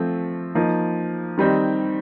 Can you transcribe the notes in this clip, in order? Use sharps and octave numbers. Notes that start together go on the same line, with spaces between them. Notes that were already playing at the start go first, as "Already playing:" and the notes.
Already playing: F3 A3 C4
F3 A#3 D#4
D#3 G3 C4 D#4